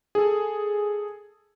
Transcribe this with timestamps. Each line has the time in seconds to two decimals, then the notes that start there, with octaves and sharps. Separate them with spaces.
0.15 G#4 A4